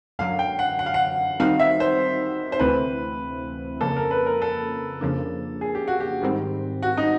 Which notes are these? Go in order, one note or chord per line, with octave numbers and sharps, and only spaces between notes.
F#2 D3 F#3 F5
G5
F#5
F#5
F5
F#5
D#3 G3 C4 D#4 F#4 F5
E5
C5
C5
D2 C3 E3 A3 C4 B4
F2 C#3 F3 A#3 A4
A#4
B4
A#4
A4
F2 C#3 F3 A#3 D4
G#4
G4
F#4
G4
G#2 D#3 G3 C4
F#4
D#4